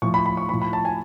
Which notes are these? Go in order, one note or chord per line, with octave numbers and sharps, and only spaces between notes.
A2 F3 C#6
B5
B5
C#6
A2 F3 B5
B5
A5
G#5